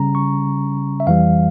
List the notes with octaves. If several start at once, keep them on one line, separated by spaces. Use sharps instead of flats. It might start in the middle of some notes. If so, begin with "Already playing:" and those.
Already playing: C#3 G3 C#4 A#5
C#6
E5
F2 E3 G3 F5